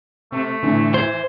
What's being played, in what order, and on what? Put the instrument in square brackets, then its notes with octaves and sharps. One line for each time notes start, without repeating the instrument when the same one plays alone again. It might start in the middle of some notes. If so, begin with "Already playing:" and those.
[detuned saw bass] C3 [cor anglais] A3
[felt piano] A2 D3 [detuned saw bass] E3
[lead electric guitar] C5 [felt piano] G#6